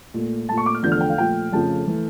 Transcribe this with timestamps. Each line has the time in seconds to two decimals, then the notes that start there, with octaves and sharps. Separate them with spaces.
0.14 A#2 A3
0.49 A#2 A3 A5
0.58 C#6
0.66 D6
0.75 F6
0.83 E2 D3 F3 A3 G6
0.92 F6
1.01 G5
1.09 F5
1.18 A#2 F3 A3 G5
1.52 F2 C#3 F3 A3 A5
1.87 E3 A3